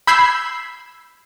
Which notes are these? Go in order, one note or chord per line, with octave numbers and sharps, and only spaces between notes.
B5 E6 G6 G#6 B6 C7